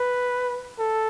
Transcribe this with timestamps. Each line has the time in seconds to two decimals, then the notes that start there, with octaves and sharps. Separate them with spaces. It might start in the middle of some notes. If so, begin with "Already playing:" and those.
Already playing: B4
0.79 A4